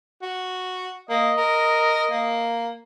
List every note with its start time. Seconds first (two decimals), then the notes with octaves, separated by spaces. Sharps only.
0.22 F#4
1.09 A#3 D#5
1.37 A#4
2.11 A#3